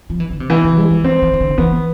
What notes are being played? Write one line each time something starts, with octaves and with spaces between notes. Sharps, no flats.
F3
E3
D3
C3
B2 E3
C3
G#3
F3
F3 C4
E3
E3
D3
E3 B3